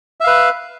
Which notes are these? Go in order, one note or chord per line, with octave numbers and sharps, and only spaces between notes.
B4 E5 F5